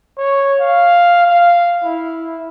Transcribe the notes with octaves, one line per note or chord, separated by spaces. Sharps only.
C#5
F5
F5
E4